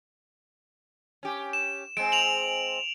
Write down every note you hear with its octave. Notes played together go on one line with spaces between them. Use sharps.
C#4 G4
E7
G#3 C4 D7
D7 F7 F#7